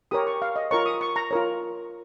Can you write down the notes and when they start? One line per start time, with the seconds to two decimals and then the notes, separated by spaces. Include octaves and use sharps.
0.11 G4 A#4 C#5 D#6
0.27 C#6
0.42 F5
0.56 D#5
0.71 F4 A#4 C#5 C#6
0.86 D#6
1.01 C#6
1.16 A#5
1.31 F4 A#4 C#5